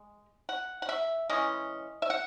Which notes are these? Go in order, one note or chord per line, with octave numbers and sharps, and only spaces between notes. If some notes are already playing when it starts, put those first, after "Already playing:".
Already playing: G#3
F#5
F#5
E5
E3 G#3 C#4 D#5
E5
F#5